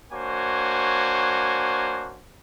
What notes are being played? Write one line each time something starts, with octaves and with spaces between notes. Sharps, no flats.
A#3 D4 F#4 C5 C#5 G#5